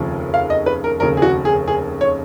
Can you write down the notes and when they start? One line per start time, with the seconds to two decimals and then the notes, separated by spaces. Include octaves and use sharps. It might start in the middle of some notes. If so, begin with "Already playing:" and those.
Already playing: F1 D#2 C#3 F3
0.34 F5
0.50 D#5
0.66 B4
0.84 A#4
1.00 F1 D#2 C#3 A#4
1.17 G#4
1.22 F#4
1.45 G#4
1.68 G#4
2.01 C#5